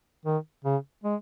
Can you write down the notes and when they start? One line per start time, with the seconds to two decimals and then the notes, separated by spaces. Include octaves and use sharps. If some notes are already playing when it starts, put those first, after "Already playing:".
0.25 D#3
0.64 C#3
1.03 G#3